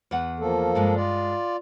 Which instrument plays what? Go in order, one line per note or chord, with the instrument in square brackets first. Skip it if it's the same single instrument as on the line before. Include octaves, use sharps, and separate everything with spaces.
[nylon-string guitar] E2 B4 F#5
[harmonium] F3 A#3 A4
[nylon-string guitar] G2 G3 G#3
[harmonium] F4 D5